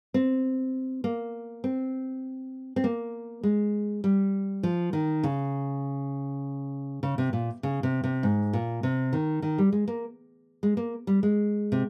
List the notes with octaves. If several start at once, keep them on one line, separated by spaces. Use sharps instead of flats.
C4
A#3
C4
C4
A#3
G#3
G3
F3
D#3
C#3
C#3
C3
A#2
C#3
C3
C3
G#2
A#2
C3
D#3
D#3
G3
G#3
A#3
G#3
A#3
G3
G#3
C3